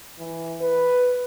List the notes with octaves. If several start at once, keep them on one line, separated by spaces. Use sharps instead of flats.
E3
B4